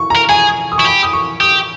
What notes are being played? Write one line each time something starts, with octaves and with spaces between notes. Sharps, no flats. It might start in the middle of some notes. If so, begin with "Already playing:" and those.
Already playing: C#6
A#5
A#4
G#4 G#5
D#6
E4 C#6
G4 B5
D#6
C#6
G4 D#6